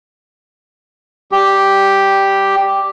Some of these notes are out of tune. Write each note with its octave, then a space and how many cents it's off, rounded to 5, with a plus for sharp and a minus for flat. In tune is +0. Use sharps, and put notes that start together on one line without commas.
G3 +0 G4 +0